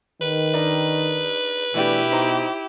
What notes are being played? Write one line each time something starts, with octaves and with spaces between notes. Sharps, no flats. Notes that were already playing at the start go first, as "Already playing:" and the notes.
D#3 B4
D4 D#4 A#4
B2 E3 A3 D4 E4 G4
D#4 C5 A#5